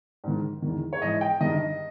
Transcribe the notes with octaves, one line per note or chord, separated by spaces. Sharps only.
G#2 D#3
E2 D#3
C#5
G#2 E3 D#5
G5
G2 D#3 D#5